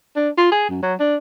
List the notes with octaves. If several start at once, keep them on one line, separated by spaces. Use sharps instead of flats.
D4
F4
G#4
F#2
F#3
D4